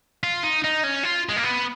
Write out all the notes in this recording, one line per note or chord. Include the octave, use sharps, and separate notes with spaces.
F4
D#4
D#4
C#4
F4
G#3
A#3
B3